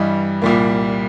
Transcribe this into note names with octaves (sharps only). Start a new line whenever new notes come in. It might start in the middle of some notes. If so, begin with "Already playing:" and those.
Already playing: G2 E3 G3 D#5
C2 A#2 G3 A#3